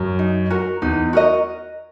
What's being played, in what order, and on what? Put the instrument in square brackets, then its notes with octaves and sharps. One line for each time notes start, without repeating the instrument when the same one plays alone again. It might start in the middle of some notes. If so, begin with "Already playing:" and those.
Already playing: [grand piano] F#2
[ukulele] D#4
F#4 A#4
[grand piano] E2 [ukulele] D#4
[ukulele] F#4 A#4 D#5